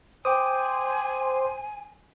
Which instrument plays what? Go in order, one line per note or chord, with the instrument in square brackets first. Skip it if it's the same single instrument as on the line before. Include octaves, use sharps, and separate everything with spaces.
[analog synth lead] C5 [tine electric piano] G5 D6 D#6 [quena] G#5